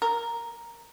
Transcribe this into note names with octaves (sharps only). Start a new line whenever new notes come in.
A#4